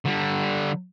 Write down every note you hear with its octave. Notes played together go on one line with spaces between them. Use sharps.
D3 G3